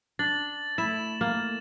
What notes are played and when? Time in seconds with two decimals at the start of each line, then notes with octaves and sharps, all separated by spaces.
0.19 D4 A6 F#7
0.78 A3 E4 A6 E7
1.21 A#3